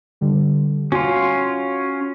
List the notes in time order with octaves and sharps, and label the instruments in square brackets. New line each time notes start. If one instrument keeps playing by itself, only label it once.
[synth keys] D3 G3
[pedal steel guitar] C#4 F4 [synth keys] F#4 C6